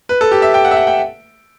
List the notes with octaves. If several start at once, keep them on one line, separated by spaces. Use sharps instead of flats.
B4
A4
G4
E5
G5
F#5
E5
F#5
G5